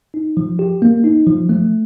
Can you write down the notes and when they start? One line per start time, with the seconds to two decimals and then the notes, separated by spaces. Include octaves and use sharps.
0.14 D#4
0.37 F3
0.59 G4
0.82 A#3
1.04 D#4
1.27 F3
1.49 A3